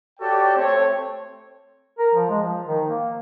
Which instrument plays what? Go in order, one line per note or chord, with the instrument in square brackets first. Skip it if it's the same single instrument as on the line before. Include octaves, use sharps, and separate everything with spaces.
[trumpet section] F#4 G4 A4 C#5 D5 G5
A3 C4 C#5
[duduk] A#4
F3
G#3
F3
D#3
A#3